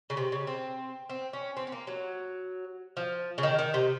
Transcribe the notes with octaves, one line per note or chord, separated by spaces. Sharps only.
C#3
C3
C#3
C4
C4
C#4
C4
C4
A#3
F#3
F3
C#3
D#3
D#3
C3